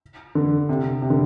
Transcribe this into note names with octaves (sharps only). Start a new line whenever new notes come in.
D3
C3
C3
D3